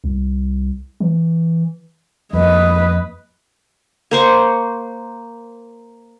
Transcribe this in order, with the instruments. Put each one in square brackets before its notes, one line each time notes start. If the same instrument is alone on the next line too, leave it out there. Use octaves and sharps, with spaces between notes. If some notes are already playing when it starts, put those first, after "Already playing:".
[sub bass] C2
E3
[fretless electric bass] F2 A#3 [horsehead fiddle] B4 D#5
[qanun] A#3 C5 C#6